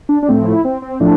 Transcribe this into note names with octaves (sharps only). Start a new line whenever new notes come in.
D4
D4
A2 F3 A3 C4
E4
C4
C4
A2 F3 A3 D4